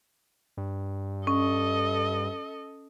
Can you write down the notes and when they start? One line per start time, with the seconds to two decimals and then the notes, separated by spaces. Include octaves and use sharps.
0.57 G2
1.27 C#4 A4 D#5